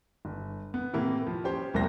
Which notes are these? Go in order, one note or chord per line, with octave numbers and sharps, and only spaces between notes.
G1
B3
A2 C3 E3 A#3
F3
C#4 G4 C5 C#5
E1 C2 F#3 A#3 C5 A#6